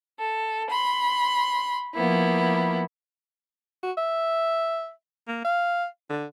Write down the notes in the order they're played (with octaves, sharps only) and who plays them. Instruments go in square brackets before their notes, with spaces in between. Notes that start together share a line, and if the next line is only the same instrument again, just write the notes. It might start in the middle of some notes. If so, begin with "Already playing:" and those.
[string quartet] A4
B5 C6
F3 A#3 B3 E4
[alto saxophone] F#4
E5
A#3
F5
D3